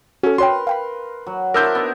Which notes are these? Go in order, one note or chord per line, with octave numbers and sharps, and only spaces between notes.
C#4 F#4 A4
F#4 A#4 B4 C#5 G5 C6
F5 G5 B5
F#3
D4 E4 A#4 C5 E6 G6
B3 D#4